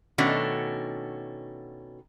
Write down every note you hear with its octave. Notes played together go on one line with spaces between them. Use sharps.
B2 D#3 A3 C#4 D4 F#4